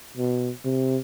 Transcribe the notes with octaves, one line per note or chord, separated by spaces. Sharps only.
B2
C3